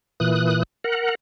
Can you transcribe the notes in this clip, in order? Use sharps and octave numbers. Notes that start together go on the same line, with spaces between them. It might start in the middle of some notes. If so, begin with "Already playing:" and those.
A#2 E3 D#6 F#6
A#4 F#5